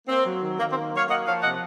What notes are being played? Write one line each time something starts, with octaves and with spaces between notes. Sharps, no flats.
A#3 C4
F#3
D#3
D#3 A#3
C4
A#3
F#3 C#5 F5
A#3 D#5 F#5
F3 C#5 F5
C3 D#5 F#5